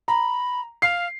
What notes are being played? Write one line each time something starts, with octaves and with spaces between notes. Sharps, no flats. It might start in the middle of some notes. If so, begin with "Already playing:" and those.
A#5 B5
F5 C7